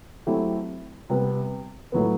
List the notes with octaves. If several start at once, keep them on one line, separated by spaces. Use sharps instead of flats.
F#3 A3 C4 E4 G4
C3 G3 B3
A2 F#3 B3